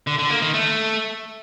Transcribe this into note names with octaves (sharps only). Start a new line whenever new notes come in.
D3
D3
A#3
D#3
A3